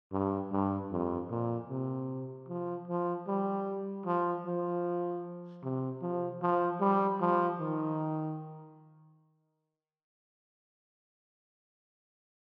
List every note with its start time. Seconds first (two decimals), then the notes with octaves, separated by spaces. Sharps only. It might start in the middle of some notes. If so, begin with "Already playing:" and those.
0.12 G2
0.52 G2
0.92 F2
1.31 A#2
1.70 C3
2.49 F3
2.88 F3
3.28 G3
4.06 F3
4.46 F3
5.63 C3
6.02 F3
6.42 F3
6.81 G3
7.21 F3
7.60 D#3